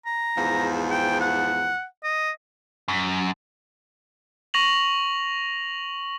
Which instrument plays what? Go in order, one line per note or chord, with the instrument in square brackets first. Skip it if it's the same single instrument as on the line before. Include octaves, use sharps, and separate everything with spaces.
[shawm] A#5
[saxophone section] E2 G#2 F3
[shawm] G5
F#5
D#5
[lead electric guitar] F#2
[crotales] C#6 A#6 F7 F#7